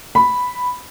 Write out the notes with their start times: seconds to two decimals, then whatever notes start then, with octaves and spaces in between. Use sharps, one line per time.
0.15 B5